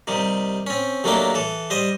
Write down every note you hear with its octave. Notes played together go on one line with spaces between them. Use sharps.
C3 D#3 G3
C4 C#4
D#2 F#3 A3 A#3 D4 G5
E3 A4
G3 C5 D#5